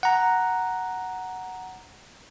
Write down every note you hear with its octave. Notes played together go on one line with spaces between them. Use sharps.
F#5 A#5